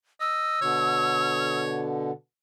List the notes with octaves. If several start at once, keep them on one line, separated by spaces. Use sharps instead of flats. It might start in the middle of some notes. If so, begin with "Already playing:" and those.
D#5 E6
B2 D3 C#5